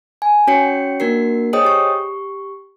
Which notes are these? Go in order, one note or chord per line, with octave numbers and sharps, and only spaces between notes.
G#5
C#4 F#4 C#5 G5 C#7
A#3 D4 F#4 A#4 C7
G#4 C5 C#5 D#5 G5 D#6
G4 C#6